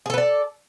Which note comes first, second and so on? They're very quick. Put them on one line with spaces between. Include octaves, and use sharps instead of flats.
G#4 A4 B4 D5